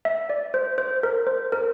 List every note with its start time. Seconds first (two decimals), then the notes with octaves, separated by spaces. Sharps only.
0.05 E5
0.30 D5
0.54 C5
0.78 C5
1.03 A#4
1.27 C5
1.52 A#4